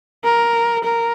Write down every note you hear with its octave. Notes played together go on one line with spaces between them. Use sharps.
A#4
A#4